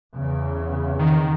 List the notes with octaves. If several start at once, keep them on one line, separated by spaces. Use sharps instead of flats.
E2 C#3
D#3